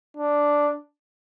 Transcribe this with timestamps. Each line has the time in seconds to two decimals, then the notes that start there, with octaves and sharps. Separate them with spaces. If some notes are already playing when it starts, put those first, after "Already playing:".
0.17 D4